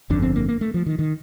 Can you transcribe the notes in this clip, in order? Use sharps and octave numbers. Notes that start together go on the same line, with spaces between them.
G1 F2 D3 D4
C4
A#3
A#3
A3
F3
D#3
D#3